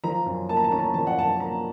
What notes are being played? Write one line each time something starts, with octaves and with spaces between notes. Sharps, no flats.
F3 A#5
F#2
A#3 A5
A#5
A5
C#4 A#5
A5
F3 A5
F#5
F#2 A5
A#3 A#5